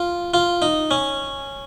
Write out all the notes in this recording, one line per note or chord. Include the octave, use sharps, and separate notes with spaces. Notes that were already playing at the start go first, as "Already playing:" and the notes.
Already playing: F4
F4
D#4
C#4